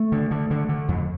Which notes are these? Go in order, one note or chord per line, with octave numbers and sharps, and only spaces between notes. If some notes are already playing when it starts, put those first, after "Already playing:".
Already playing: A3
D3
D3
D3
D3
F2